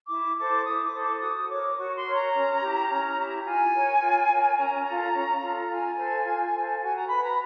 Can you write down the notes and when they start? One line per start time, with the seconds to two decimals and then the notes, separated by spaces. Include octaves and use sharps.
0.09 E4 D6
0.37 A4 C5 D6
0.65 E4 D#6
0.84 D6
0.93 A4 C5
1.02 D6
1.21 F#4 D#6
1.49 A#4 C#5 D6
1.77 F#4 C#6
1.96 C6
2.05 A#4 C#5
2.14 A#5
2.33 C#4
2.61 E4 G4
2.89 C#4
3.17 E4 G4
3.45 F4 G#5
3.73 A#4 C#5
4.01 F4
4.29 A#4 C#5
4.57 C#4 A#5
4.85 F4 A4
5.13 C#4
5.41 F4 A4
5.69 F4 G#5
5.97 A4 C5
6.25 F4
6.54 A4 C5
6.81 F#4 G#5
6.96 A#5
7.09 B4 B5
7.23 A#5